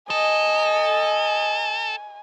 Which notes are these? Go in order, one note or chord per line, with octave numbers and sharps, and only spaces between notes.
A4 D#5 G#5